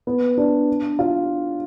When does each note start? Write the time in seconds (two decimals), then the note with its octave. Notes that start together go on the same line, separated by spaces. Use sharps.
0.07 B3
0.38 D4
0.99 F4